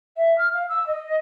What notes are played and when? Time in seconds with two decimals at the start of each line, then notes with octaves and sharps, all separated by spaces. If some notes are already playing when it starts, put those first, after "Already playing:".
0.16 E5
0.38 F6
0.53 F5
0.69 E6
0.86 D#5